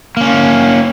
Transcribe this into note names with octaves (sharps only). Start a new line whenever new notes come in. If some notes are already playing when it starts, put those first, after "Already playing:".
A#3 C#4